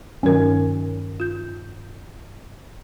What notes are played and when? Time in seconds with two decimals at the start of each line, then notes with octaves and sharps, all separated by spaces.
0.23 G2 D#3 F#3 C#4 A#4
1.20 F4 G6